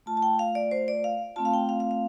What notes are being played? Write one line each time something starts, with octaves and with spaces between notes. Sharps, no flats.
A3 F4 A5
A5
G5
F5
D5
C5
D5
F5
A3 C4 F4 A5
F5
G5
F5
F5
F5